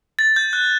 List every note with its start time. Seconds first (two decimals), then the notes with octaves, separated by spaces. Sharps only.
0.19 A6
0.36 G6
0.53 F#6